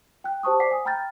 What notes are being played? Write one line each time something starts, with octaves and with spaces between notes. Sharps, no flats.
G5 F#6
G4 C5 A5 C#6 D#6
C5 D5 F#5 D6 B6 C7
G#5 D#6
G5 A#5 B5 F6 G6 A6